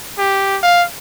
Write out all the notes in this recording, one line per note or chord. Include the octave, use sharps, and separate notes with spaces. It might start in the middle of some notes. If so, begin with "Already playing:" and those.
G4
F5